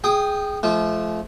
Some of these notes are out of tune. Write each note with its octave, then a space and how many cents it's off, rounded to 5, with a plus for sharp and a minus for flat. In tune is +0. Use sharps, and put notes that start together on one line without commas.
G#4 +0 G5 +0 D#6 -25
F3 -20 A3 -40